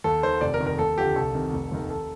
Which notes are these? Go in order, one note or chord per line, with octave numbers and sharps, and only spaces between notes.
D#2 A4
D#3 C5
F1 D5
A#4
F2 D#3
A#4
D#2 A4
D3 F3 G4
C2 A4
C3 D#3
F1
D#2 D#3
A4